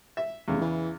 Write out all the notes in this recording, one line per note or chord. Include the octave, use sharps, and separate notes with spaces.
E5
F1 E2 C#3
E3